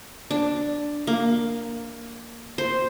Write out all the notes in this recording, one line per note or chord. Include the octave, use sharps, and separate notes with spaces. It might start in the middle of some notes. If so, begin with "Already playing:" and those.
D4
A#3
C5